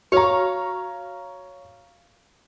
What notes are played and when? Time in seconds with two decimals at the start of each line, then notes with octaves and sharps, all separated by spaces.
0.12 F#4 C#5 F5 A#5 C#6